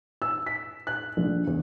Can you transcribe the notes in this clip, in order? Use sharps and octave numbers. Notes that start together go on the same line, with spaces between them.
E6
B6
F#6
A#1
E2